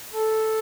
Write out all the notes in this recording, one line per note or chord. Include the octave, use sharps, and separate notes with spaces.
A4